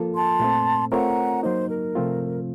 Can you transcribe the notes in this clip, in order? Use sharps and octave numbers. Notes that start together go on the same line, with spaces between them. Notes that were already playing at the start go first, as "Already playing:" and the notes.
Already playing: F3 A#3 F4 A4
A5 C6
A#2 A3 C4
A3 C4 F4 A#4 C#5 F#5 A#5
F#3 A#3 D#4 C5
A#4
C3 F3 A3 C4 F4